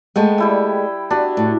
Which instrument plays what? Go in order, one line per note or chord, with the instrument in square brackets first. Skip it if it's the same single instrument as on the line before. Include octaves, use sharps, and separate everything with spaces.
[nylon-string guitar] G#3 A3 B3 [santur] G5
[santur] G3 E4 G5
[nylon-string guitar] B3 [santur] D4 F#4 G4
[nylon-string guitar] A2